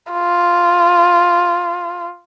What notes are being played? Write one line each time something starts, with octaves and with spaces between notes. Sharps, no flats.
F4